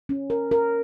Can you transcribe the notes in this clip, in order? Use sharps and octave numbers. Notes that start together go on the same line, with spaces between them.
C#4
A#4
A#4